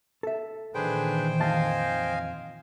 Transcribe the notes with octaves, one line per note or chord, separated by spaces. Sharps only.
A4 E5
A#2 D#3 E3 D4 G#4 B4 C5 G5
F2 D#5 F5 G#5 A5